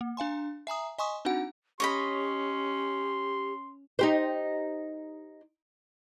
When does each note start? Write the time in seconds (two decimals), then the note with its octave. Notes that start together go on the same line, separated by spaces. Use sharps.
0.01 A#3
0.17 D4 F5 G#5 C6
0.67 E5 G#5 A#5 D#6
0.98 D#5 G#5 C6 C#6 D#6
1.25 C4 D4 D#4 F#4 F#5
1.80 C#4 G4 C#5 D#5 B5 C6
3.99 D#4 G4 C5